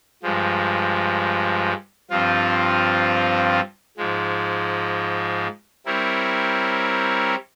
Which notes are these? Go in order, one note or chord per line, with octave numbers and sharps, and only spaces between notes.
G2 F3 G#3
G2 F3 C4 F4
G#2 F3 G#3
G3 C4 E4 A#4 C#5